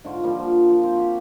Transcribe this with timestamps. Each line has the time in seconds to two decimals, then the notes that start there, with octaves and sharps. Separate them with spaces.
0.04 G#2 D3 F4 C#6
0.23 F3 G3 A#3
0.39 F3
0.70 F3
0.83 C4
0.96 F#4 G4